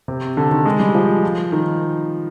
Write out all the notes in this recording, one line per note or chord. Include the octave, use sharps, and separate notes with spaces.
C3
D3
D#3
G#3
G3
F3
D#3